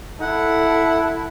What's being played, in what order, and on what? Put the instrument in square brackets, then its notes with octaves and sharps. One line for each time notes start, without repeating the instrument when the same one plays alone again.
[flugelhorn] E4 [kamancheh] A4 [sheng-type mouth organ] F#5